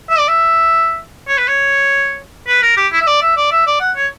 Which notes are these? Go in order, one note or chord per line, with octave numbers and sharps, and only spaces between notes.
E5
D5
E5
C#5
B4
C#5
B4
A#4
G4
E4
E5
D5
E5
D5
E5
D5
F#5
C#5